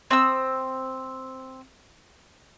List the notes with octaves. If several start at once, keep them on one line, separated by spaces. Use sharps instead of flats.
C4 D#6 E6